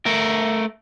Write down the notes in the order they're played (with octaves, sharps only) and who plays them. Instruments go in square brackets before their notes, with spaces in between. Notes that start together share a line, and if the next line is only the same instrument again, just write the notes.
[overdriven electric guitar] A3 A#4